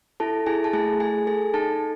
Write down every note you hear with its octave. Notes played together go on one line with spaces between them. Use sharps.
E4 A4 A5
E4 G#4 G#5
A5
A3 G#4 G#5
G#4 G#5
G#4 A4 G#5
D#4 A4 A5